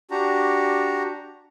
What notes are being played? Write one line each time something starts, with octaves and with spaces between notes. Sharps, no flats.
D4 F#4 G4 A#5